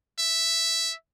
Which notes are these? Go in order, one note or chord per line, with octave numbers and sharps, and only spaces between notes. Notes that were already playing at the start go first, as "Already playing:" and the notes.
E5